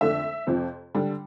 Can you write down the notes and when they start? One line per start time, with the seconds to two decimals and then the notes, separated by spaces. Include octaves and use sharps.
0.01 F2 D3 A3 D4 E5
0.47 F2 C3 F3 C4
0.95 D3 G3 D4